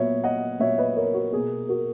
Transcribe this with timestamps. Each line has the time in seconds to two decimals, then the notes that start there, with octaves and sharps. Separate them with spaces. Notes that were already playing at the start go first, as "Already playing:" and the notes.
Already playing: A#2 F#3 B3 C#5 E5
0.24 D#5 F#5
0.60 A#2 F#3 B3 C#5 E5
0.78 B4 D#5
0.96 A#4 C#5
1.14 F#4
1.32 B2 A#3 G#4
1.69 F#4 A#4